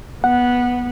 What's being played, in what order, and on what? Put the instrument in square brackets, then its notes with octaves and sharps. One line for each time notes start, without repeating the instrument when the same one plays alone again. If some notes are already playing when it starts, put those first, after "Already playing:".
[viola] B3 [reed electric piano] F#5